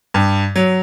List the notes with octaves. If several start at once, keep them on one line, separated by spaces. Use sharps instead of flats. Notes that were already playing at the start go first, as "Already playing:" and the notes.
G2
F#3